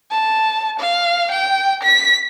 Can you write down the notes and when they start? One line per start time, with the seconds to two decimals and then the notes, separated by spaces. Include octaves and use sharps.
0.11 A5
0.80 F5
1.32 G5
1.83 B6